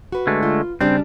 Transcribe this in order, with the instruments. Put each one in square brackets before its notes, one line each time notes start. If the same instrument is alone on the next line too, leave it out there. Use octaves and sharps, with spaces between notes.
[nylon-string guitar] F#4 B4
[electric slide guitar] D3 G#3 A3
[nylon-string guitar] F4
[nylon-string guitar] C#3 G3 D4 [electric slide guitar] C4